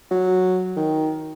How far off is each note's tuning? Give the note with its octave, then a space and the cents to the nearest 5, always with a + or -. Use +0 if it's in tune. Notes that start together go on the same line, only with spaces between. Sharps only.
F#3 -5
D#3 +10